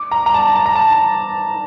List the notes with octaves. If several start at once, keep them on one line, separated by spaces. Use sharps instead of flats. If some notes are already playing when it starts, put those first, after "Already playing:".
Already playing: D6
A#5
A#5
A5
A5
A#5
A5